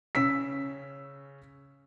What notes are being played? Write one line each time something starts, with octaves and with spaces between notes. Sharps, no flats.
C#3 C#4 E6 B6